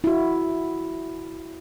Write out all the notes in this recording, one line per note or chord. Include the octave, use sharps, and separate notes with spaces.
E4 F#4